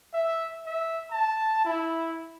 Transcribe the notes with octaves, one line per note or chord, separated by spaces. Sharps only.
E5
E5
A5
E4